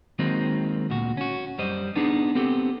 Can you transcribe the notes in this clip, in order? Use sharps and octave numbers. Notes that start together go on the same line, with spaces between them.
D#3 F#3 G#3 A#3 C4 D#4
D2 A#2 F#4
C#4 F#4
F#2 G3 C5 D#5
B3 D4 D#4 G#4
B3 C4 G4 A4